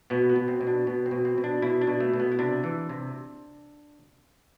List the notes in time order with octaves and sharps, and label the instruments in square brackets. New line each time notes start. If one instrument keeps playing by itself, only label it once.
[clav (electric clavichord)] B2 B3
B3
B2
C4
B2
D4
B2 B3
C4
B2
C4
B2
D4
B2 E4
D4
B2
A3
B2
B3
E4
C3 D4
E3
C3